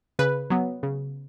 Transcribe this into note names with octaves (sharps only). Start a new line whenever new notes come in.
C#3 B4
F#3 B3
C#3